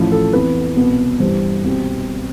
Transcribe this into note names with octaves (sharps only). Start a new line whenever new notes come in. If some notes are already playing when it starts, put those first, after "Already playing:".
Already playing: A1 A2 F3
A4
F2 E3 B3 B4
C2 B2 B3
G2 E3 G3 C5
C2 B2 G3 C4